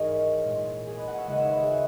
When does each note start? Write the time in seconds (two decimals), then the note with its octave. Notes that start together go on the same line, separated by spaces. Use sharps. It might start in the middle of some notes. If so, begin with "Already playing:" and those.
Already playing: G#2 E3 G#4 A#4 C#5 D#5
0.44 A#2 G#3
0.87 G#4
0.97 B4 D#5
1.07 D#5 F#5
1.18 C#5 E5
1.27 D#2 C#3 G#3 D#5 F#5
1.39 C#5 E5
1.50 G#4 B4
1.60 G#4
1.71 F#4